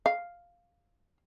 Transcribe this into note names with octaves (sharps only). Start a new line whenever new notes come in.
F5